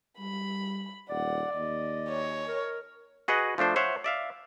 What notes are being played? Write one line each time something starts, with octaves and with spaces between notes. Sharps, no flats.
G3 B5
D#1 D5 F#5
D#2 D#5
C#5
A#4
F#4 G#4 B4 D#5 F#5
F3 A3 D4 C5
C5 C#5 E5 F#5
D5 E5 F5